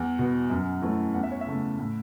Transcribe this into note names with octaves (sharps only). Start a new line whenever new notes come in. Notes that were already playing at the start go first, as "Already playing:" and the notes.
Already playing: E2 F#5
B2 B3
F#2
E3 A3 C#4
E2 F#5
E5
C#5
E5
C#3 A3
A2